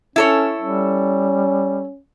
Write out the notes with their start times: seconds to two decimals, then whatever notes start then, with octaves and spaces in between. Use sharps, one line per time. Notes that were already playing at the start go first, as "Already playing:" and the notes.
0.16 C#4 E4 A4 C#5
0.61 G3 C#4